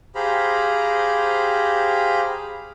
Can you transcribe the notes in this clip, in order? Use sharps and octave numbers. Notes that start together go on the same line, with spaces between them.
G4 G#4 C5 F5 A#5 B5